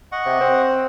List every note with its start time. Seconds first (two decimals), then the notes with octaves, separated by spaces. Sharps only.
0.12 D#5 F#5 C#6
0.26 C3
0.41 C4